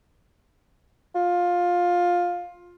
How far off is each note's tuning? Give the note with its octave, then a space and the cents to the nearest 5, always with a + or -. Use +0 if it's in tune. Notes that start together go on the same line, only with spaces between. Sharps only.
F4 +15